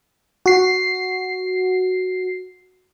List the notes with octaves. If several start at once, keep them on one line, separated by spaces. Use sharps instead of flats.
F#4 C7